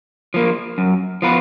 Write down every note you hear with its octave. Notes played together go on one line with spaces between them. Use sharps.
F3 A#3
F#2
F3 B3 F4 B4